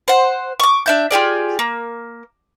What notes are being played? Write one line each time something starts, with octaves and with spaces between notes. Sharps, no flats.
C5 F#5
C#6 D6
D4 E5 G6
F4 G4 G#4 D5
A#3